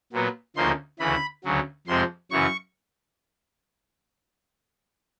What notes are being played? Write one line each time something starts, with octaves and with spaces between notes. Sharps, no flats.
A#2 F#3 B3
D2 C#3 F3 A#3 D#4 C6
D2 C#3 E3 B5
D2 C#3 F#3
F2 C3 F3 G#3 C4 C6
F#2 C#3 E3 C#6